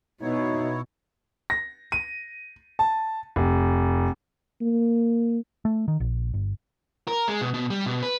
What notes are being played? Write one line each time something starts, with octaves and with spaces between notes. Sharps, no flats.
B2 D#4 E4 C#5
A#6
D#7
A5
F1
A#3
A3
D#3
A#1
G1
A#4
G#3
B2
B2
G3
B2
B4